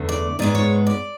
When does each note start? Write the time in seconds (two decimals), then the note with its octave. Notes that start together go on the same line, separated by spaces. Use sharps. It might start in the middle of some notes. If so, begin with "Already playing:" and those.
Already playing: E2 D3 A3
0.09 D5
0.39 G#2 G#3 B3 D5
0.55 C#5
0.87 D5